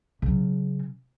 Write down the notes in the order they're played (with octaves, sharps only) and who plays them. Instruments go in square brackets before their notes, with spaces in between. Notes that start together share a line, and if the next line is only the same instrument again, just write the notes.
[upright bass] C#3 F#3